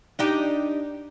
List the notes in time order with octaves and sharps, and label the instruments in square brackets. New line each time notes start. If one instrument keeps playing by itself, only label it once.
[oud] D4 D#4 G4